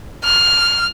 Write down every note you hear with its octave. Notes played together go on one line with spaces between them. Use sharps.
F6